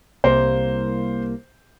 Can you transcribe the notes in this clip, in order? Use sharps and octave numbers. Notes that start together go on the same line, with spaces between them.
C2 A#3 C5